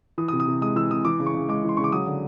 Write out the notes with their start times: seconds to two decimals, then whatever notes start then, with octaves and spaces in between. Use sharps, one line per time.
0.18 E3 D#6
0.28 D#6
0.33 C3
0.40 D#6
0.47 C3
0.61 G#3 D#6
0.76 E3 E6
0.90 C3 D#6
1.05 E3 D6
1.20 C#3
1.26 C#6
1.35 C#3
1.49 G#3 D6
1.64 E3 C6
1.77 C#3 C#6
1.84 D6
1.92 F#3 D#6
2.07 D3